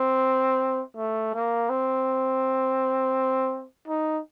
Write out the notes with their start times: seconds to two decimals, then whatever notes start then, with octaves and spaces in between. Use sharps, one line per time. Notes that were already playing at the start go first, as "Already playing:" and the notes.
Already playing: C4
0.97 A3
1.34 A#3
1.70 C4
3.88 D#4